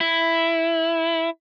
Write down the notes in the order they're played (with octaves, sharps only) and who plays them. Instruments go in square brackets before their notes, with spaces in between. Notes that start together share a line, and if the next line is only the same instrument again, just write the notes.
[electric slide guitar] E4